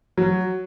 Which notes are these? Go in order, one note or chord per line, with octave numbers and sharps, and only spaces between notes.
F#3